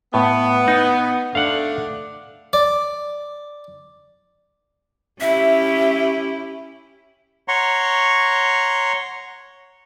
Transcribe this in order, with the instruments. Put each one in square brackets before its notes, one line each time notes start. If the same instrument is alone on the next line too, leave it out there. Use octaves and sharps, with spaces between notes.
[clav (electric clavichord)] A2 [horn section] B3
[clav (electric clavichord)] D#4
[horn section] D3 A3 D4 [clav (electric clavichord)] F5 F#5
[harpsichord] D5
[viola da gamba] C#4 E4 G4 [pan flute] E5
[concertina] C#5 F#5 A#5 C6 C#6